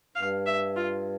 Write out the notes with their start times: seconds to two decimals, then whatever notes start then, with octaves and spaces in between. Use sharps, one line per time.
0.15 G2 F5
0.46 E5
0.76 F4